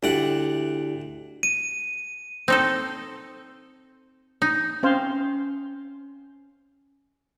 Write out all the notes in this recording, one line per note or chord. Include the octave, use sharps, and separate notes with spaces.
D2 D4 E4 G4 D5 F#5
D#7
C4 D#4 A4
D#4
C4 C#4 C5 F5